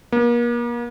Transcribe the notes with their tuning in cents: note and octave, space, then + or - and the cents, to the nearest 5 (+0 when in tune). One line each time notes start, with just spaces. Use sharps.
A#3 +40